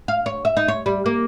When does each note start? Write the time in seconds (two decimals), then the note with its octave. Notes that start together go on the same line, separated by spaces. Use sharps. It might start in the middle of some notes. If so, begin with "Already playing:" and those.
0.08 F5
0.26 C#5
0.45 E5
0.57 D#4
0.68 C#5
0.86 G3
1.06 A#3